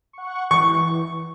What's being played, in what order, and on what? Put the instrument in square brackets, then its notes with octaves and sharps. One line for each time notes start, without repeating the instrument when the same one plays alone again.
[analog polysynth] F#5 C#6
[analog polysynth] E3 [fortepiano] C#6